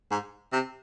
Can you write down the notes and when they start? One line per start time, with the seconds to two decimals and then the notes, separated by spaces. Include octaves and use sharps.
0.11 G#2
0.52 C3